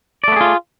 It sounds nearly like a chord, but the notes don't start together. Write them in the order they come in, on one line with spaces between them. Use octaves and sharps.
D5 A3 B3 G#4 F4